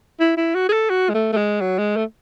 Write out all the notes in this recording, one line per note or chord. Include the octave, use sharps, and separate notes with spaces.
E4
E4
F#4
G#4
A4
F#4
G#3
A3
A3
G#3
F#3
G#3
A3